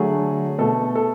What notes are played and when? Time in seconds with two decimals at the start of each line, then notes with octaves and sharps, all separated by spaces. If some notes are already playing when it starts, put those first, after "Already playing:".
Already playing: D3 F#3 A3 G#4
0.58 B2 A3 A4
0.95 A4